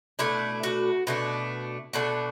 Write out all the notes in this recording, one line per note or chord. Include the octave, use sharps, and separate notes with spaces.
B2 A3 D4 E4
F#4
B2 A3 D4
B2 A3 D4 F#4